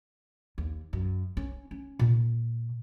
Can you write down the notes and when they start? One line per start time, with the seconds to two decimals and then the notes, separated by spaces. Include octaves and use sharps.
0.58 D#2
0.93 F#2
1.37 C#4
1.71 C#4
1.99 A#2